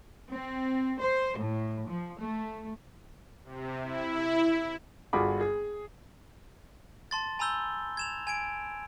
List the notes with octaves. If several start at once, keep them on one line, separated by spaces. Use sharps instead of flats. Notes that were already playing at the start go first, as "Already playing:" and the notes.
C4
C5
A2
F3
A3
C3
E4
G1 F4 F#4 G#4 B5 D6
G#4
A5 C6 A6
G#5 A#5 B5 E6 G6 G7
G#6 E7 F7
G#5 G#6 D7